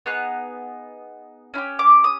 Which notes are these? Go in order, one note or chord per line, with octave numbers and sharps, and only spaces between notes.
B3 D#4 G#4 F#6
C#4 E4 G4
D6
D#6